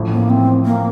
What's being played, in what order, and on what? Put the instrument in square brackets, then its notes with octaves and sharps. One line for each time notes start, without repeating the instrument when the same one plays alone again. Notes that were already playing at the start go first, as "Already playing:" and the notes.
Already playing: [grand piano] A1 A2 F3
[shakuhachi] A#3
C4
A#3